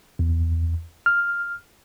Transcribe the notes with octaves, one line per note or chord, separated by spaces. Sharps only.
E2
F6